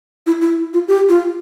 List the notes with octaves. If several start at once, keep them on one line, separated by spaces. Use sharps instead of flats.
E4
E4
F4
G4
F4